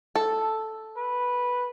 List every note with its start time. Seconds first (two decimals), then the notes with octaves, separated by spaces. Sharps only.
0.16 A4
0.97 B4